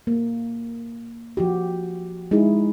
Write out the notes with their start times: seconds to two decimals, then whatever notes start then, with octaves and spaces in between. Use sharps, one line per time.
0.07 A#3
1.37 F3 F#4 G4
2.31 G#3 D#4 E4 G#4